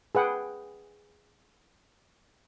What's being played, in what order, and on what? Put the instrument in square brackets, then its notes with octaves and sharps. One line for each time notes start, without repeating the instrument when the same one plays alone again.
[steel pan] G#4 B4 F#5 G5